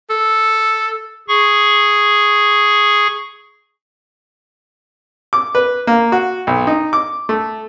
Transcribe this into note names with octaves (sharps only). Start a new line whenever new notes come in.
A4
G#4 C#6
D6
B4
A#3
F#4
B1
D#4
D6
A3